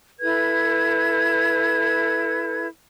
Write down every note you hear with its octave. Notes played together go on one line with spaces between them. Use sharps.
E4 A4 B4 G#6